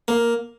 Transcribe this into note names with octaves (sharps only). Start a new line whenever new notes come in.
A#3